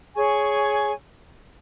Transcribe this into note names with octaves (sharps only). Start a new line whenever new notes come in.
G#4 C#5 G#5 C#6